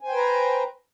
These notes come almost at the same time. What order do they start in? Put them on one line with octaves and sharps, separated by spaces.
G#5 C5 G5 B4 A#5